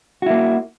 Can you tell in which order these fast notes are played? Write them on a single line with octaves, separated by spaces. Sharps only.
F#4 E4 A#3